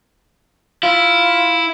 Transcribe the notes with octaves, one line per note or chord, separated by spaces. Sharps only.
E4 F4